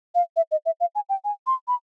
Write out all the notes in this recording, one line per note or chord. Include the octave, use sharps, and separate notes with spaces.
F5
E5
D#5
E5
F5
G#5
G5
G#5
C6
B5